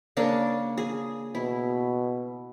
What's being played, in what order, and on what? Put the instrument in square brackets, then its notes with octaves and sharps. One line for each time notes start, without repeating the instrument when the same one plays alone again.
[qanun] C#3 A#3 D4
G#4
[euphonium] B2 [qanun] E4